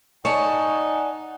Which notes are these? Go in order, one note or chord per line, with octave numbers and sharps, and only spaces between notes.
D#4 C#5 D5 F#5 G#5 A5